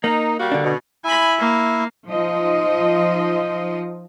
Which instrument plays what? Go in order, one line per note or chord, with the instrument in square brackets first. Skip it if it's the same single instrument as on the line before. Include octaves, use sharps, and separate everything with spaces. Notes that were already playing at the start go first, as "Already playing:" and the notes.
[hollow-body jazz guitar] A#3 [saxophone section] D#4
[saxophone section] G3 A#3 F#4
[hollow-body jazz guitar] D3 D4
[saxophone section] B2
[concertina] E4 E5 [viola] G#5 B5
[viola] A#3
[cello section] F3 D#4 D#5